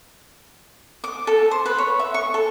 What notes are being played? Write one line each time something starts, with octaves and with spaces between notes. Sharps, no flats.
D6
A4
C5
B4
C#5
E5
C#6
A4